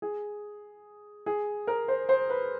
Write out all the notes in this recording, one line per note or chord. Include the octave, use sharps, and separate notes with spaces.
G#4
G#4
A#4
C5
C5
B4